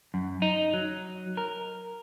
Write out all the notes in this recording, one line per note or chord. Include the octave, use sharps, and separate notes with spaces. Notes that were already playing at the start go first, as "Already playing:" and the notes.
F#2
D#4
F#3
A#4